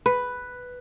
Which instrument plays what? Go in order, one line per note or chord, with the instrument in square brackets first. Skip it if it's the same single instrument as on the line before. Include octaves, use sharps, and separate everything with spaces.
[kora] B4